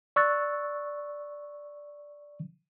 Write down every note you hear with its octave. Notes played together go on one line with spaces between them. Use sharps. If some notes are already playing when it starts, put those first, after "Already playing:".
D5 C#6 E6 F#6 A6